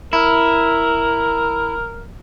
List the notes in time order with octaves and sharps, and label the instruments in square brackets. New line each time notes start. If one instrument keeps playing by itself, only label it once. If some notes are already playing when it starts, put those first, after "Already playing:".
[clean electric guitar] E4 [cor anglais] A#4